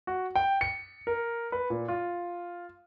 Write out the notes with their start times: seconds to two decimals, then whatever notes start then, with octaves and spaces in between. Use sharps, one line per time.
0.07 F#4
0.35 G5
0.61 C#7
1.07 A#4
1.52 B4
1.70 A#2
1.88 F4